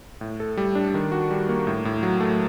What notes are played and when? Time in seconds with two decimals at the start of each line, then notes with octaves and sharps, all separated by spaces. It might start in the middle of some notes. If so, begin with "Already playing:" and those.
0.21 A2
0.40 A4
0.57 G3
0.75 D4
0.94 D#3
1.12 F#4
1.31 G3
1.49 A#3
1.67 A2
1.85 A2
2.03 F#3
2.20 A3